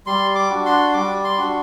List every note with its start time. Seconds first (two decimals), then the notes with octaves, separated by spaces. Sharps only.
0.07 G3 C6
0.35 D6
0.50 D4 F#4
0.66 C6
0.94 G3 D6
1.24 C6
1.38 D4 F#4